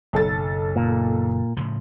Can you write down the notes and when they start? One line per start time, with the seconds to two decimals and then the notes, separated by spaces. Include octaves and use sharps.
0.13 F#1 B1 A4 A6
0.76 A#2
1.57 A2 C#3 F3